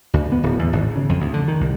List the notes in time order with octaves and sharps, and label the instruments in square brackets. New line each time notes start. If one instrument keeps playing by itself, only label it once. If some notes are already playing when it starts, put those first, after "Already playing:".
[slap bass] D2
B3
D1
E2
G#1
C#3
F2
D2
D3
D#3
C2